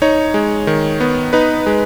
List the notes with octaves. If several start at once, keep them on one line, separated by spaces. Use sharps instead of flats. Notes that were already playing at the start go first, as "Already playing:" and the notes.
D#4 C#5
G#3
D#3
B3
D#4 B4
G#3